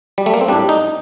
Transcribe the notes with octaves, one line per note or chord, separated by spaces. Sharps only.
G3
A3
A#3
C4
A2 G3 D4
D#4